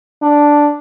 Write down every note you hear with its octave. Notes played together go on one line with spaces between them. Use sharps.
D4